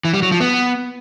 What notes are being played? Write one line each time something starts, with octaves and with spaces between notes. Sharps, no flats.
E3
G3
F#3
F3
B3